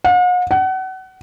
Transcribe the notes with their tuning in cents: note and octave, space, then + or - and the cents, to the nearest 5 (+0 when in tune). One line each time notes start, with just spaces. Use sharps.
F#5 -45
F#5 +30